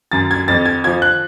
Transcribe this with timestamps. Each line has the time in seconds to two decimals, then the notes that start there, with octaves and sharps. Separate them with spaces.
0.12 F#2 A6
0.31 G#6
0.48 F2 A6
0.65 G#6
0.84 F3 G#6
1.02 F#6